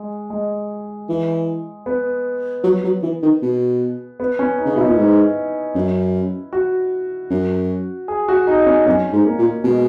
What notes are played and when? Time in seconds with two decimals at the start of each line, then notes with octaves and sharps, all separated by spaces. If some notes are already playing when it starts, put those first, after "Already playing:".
Already playing: G#3
0.30 G#3
1.09 E3
1.86 B3
2.64 F#3
2.84 F#3
3.03 E3
3.22 D#3
3.42 B2
4.20 B3
4.39 C#4
4.58 D#4
4.65 C#3
4.73 D#4
4.76 B2 E4
4.86 A#2
4.97 G#2
5.75 F#2
6.53 F#4
7.30 F#2
8.08 G#4
8.28 F#4
8.47 D#4
8.66 C#4
8.86 F#2 C#4
9.13 G#2
9.25 A#3
9.38 A#2
9.64 B2 G#3